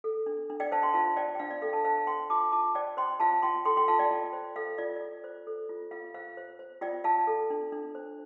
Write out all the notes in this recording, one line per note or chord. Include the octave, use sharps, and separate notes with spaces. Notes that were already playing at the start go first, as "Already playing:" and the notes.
A4
D4
D4
D5 G5
C5 F5 A5
G5 C6
F4 F5 A5
C5 D5 G5
G5
D4 F5
D5
A4 F5
F5 A5
C5 F5 A5
C5 G5 C6
F4 A5 D6
F4 A5 D6
C5 D5 G5
C5 G5 C6
F4 F5 A5
F4 G5 C6
A4 G5 C6
G5 C6
F4 F5 A5
D5 G5
F4
C5
A4 F5
F4 D5
D5
F4
C5
A4
F4
F4 F5
C5 F5
C5
C5
F4 D5 G5
F4 F5 A5
A4
D4
D4
C5